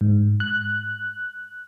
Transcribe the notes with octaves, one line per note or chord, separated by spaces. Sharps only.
G#2
F#6